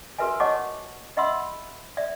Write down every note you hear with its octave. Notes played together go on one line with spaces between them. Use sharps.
F#4 A#4 B4 E5 G#5
C#5 D#5 F#5 A5 C#6 D6
D#5 E5 F#5 B5 C6 E6
D5 E5